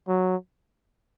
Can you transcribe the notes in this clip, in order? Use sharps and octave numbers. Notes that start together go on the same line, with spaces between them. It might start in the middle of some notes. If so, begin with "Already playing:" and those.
F#3